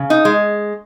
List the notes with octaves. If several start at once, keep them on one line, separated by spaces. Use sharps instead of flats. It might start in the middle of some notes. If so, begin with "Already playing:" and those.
Already playing: C#3
D#4
G#3